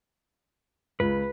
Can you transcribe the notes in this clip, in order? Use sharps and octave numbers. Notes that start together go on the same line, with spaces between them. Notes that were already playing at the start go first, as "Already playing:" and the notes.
C#2 B4